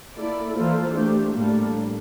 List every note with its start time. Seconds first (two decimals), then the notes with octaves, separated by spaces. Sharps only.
0.16 A#3 E4 A4 D5
0.55 E3 A#3 F4 A4 C5
0.95 A3 D4 G4
1.34 A2 G3 A#3 D4 A4